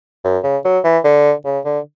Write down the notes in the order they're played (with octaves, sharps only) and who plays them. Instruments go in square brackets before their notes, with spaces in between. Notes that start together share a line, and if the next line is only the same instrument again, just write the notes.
[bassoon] F#2
C#3
F#3
E3
D3
C#3
D3